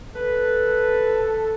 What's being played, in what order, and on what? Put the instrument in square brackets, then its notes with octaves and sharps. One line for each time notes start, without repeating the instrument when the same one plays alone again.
[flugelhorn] A4 [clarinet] B4